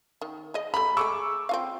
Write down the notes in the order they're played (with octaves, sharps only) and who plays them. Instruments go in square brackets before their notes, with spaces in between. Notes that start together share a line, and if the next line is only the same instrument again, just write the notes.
[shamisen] D#3
G#4 D#5
[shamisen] A3 G4 A#5 [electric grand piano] B5
[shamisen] G#3 A3 G#4 [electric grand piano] C#6 D6 E6
[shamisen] C4 F4 F5